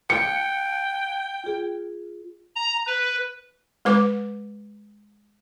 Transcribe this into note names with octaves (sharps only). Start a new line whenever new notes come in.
G5 C#7
F4 G#4
A#5
B4
G#3 B4 D6